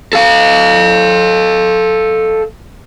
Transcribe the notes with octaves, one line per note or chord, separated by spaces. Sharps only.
A4 F5